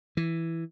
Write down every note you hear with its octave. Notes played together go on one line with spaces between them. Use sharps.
E3